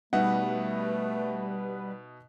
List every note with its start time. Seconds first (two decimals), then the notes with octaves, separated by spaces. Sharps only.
0.13 B2 G3 A3 D#4 B4 E5 F#5